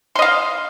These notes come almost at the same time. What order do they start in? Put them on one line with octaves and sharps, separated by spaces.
C6 D#5 F5